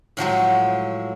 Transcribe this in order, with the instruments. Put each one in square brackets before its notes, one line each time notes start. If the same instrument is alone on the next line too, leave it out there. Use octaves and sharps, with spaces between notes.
[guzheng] A2 F3 F#3 G#3